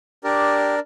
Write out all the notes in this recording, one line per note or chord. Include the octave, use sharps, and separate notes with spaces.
D4 G4 A#4 D5